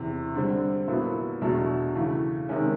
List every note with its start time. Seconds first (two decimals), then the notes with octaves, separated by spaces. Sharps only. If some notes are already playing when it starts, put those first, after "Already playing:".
Already playing: E2 C3 E3
0.34 D3 G3 C4
0.87 A#2 F#3 B3 E4
1.41 E2 B2 F#3 A3 D4
1.95 C#3 E3 A3
2.49 C3 D#3 G#3 C#4